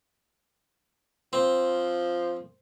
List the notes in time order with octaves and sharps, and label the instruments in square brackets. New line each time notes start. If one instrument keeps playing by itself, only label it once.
[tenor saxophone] F3 [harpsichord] C4